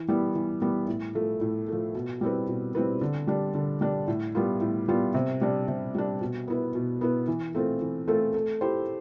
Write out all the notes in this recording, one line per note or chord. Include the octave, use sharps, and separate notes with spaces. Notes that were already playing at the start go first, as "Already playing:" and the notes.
Already playing: E3
G3 B3 E4
E3
G3 B3 E4
A2
F3 A3
A2
F3 A3
B2
G3 C4 E4 B4
B2
G3 C4 E4 B4
D3
G3 D4
D3
G3 D4
A2
G3 B3 F4
A2
G3 B3 F4
C3
G3 D4
C3
G3 D4
B2
B3 E4 B4
B2
B3 E4 B4
E3
A3 C4 F4 A4
E3
A3 C4 F4 A4
A3
E4 G4 C5